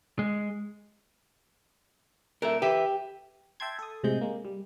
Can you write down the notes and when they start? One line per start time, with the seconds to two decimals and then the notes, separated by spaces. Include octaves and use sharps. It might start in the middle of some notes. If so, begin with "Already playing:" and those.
0.19 G#3
2.42 A#2 A4 A#4 E5
2.62 G4 B4 E5
3.60 E5 G5 A5 C6 G#6
3.79 A4 D#6
4.03 A2 C3 G#3 D#5 G6
4.21 G#3 A#3
4.45 G3